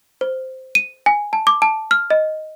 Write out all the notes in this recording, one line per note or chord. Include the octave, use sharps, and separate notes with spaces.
C5
D#7
G#5
A5
D6
A5
F6
D#5